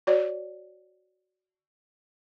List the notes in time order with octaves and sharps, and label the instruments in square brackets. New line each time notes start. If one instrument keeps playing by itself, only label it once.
[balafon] F#4 C#5 D5